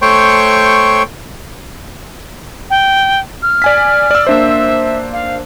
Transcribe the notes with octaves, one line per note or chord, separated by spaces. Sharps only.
A3 C5 C#5 G5 C6 C#6
G5
F6
D5 G#5 B6
D5 E6
A#3 D4 C5 E5
F5